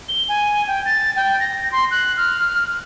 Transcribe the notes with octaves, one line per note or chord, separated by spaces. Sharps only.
G7
G#5
G5
A6
G5
A#6
C6
F#6
F6